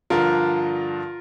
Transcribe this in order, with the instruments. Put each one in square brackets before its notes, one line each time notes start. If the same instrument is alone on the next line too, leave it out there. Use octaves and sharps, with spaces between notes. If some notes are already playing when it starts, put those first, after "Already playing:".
[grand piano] G2 D3 F3 F4 A#4